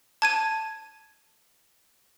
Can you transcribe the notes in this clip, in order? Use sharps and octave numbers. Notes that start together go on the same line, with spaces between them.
A5 G#6 D#7